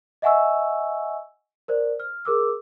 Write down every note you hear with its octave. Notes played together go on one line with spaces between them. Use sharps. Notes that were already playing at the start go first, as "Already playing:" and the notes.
D#5 E5 F#5 G#5 C#6 E6
A#4 C5 D5
F6
G#4 A#4 D6 E6